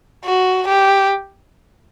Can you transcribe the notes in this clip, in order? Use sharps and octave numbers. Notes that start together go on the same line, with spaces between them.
F#4
G4